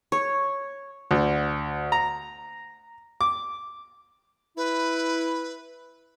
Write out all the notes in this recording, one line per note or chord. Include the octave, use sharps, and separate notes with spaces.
C#5
D2
A#5
D6
E4 B4